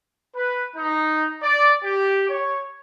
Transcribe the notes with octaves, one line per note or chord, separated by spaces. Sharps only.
B4
D#4
D5
G4
C#5